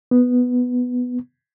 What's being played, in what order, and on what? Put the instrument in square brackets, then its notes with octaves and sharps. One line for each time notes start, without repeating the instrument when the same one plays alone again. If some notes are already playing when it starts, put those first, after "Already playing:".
[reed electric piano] B3